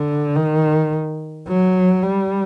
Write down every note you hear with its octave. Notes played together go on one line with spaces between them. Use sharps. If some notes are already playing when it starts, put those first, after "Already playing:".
Already playing: D3
D#3
F#3
G3